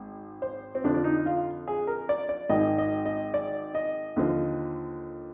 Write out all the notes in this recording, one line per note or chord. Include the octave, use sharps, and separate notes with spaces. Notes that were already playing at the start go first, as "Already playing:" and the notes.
Already playing: G#1
C5
C4
F2 D3 F3 D4
D4
D#4
F4
G#4
A#4
D5
D5
G#1 G#2 D#3 D#5
D#5
D#5
D5
D#5
D#2 D3 F3